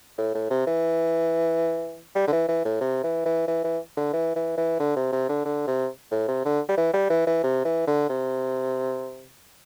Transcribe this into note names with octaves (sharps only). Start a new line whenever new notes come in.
A2
A2
C3
E3
G3
D3
E3
E3
A2
C3
E3
E3
E3
E3
D3
E3
E3
E3
D3
C3
C3
D3
D3
C3
A2
C3
D3
G3
E3
G3
E3
E3
C3
E3
D3
C3